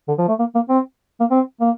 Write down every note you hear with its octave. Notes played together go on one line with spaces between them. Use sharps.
D3
F3
A3
A#3
A#3
C4
A#3
C4
A#3